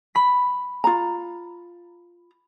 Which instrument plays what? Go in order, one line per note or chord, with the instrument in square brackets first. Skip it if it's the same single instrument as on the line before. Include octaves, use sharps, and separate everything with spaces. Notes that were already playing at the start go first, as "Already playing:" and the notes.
[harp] B5 B6
[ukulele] F4 A#5